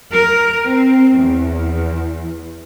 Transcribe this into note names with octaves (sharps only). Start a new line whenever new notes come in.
A#4
C4
E2